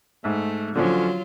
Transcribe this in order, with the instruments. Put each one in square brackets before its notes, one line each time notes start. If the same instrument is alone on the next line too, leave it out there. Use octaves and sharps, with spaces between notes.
[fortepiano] G#2 E5 [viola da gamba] A3
[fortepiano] D3 F3 C#4 [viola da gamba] F#3 F4